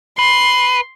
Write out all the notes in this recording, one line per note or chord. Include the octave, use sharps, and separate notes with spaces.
B4 C6